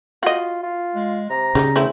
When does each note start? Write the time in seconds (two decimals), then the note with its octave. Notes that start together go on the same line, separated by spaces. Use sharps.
0.23 F4 F#4 D#5
0.63 F4
0.95 G#3
1.30 C3 A#5
1.55 C#3 G3 B3 D#4
1.76 E2 A3 C4 E4